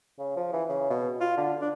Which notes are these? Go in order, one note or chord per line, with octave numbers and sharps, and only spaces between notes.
C#3
F3
E3
C#3
B2
F4
D3
D4